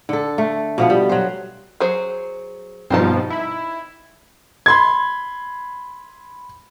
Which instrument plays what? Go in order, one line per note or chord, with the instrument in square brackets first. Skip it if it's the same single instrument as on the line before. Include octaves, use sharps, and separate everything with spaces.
[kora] D3 A4
A3
B2 F3 B3
G3
F#3 C5
[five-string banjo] F#3 G#4 C5
[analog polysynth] G2 B2 F3 [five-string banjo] C4 D#4 A5
[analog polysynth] E4
[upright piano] B5 C6 G#6